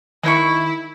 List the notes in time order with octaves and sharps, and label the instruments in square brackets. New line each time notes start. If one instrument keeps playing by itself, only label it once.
[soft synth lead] D#3 [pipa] G#3 C5 C#6 [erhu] E4